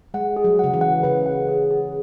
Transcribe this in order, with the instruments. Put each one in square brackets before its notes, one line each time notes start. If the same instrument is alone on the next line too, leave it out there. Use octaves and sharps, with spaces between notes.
[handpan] G#3 [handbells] F#5
[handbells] G#4
[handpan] F#3
[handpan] C#3 [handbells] F#5
[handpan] E3
[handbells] F#5
[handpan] C#3 [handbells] B4
[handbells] F#5
G#4
G#4